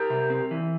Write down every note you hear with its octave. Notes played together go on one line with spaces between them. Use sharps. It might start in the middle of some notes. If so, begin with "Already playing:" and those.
Already playing: G4 A#4
C3
C4
E3